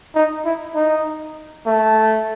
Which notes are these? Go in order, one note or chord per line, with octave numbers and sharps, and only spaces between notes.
D#4
E4
D#4
A3